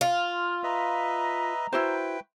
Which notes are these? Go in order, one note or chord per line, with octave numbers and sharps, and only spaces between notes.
F4 F6
B4 D#5 E5 A#5
E4 F#4 B4 C5 G5